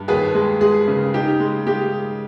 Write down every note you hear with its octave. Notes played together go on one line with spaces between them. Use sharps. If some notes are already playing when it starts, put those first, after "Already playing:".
Already playing: G2
D#2 G#4 B4
G#3
G#3 G#4
C#3
D#4 G4
G#3
G#3 G4